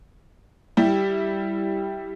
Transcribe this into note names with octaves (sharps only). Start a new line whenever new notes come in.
G3 E4 G4